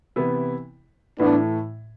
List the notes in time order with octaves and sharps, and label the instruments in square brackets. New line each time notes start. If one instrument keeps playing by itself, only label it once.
[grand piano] C3 E3 B3 E4
[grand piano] A2 E3 A3 [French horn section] B3 D4